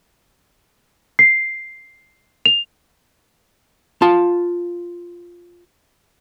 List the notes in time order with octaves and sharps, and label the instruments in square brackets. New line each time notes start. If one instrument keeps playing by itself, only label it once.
[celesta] C7
F7
[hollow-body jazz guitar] F4 A5